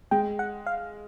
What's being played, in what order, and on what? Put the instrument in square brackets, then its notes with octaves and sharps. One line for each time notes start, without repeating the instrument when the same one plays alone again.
[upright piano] G#3 [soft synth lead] G5
[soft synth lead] F#5
F5